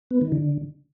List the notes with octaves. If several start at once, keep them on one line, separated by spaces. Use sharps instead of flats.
B3
D#3
D3